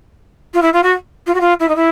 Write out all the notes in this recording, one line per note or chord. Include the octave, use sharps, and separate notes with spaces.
F4
E4
F4
F#4
F4
F#4
F4
E4
D#4
E4